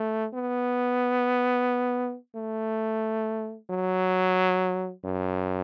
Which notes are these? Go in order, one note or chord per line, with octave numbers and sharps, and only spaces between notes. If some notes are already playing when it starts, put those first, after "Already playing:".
Already playing: A3
B3
A3
F#3
F#2